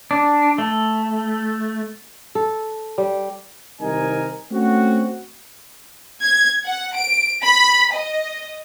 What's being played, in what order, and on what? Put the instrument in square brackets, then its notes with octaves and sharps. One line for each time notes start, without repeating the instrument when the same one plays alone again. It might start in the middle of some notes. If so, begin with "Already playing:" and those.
[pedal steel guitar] D4
A3
[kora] A4
G3
[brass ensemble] C2 C3 D#3 D#4 A#4 G#5
A3 C4 C#4 F#4
[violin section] G#6
F#5
D7
B5
D#5